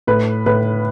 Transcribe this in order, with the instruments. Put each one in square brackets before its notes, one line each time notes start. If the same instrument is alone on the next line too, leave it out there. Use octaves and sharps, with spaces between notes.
[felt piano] A2 [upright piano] B4
[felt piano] A2 [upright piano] B4